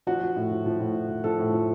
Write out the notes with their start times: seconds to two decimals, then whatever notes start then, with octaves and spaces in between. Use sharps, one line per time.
0.07 F3 F#4
0.21 F3
0.36 A2
0.51 F3
0.66 F3
0.80 A2
0.95 A2
1.09 F3
1.24 F3 A4
1.39 A2
1.53 F3